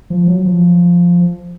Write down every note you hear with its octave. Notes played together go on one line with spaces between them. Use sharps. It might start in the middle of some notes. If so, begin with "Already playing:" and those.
F3
F#3
F3